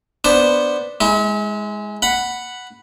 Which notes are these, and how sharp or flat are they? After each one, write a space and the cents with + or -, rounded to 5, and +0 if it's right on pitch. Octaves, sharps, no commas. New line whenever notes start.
B3 +0 D4 +0 C5 +0
G#3 +0 E4 -45
F#5 +0 B5 +0